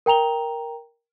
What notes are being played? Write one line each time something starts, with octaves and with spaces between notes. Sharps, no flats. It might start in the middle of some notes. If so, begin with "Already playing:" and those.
A#4 G5 A#5 F7 G7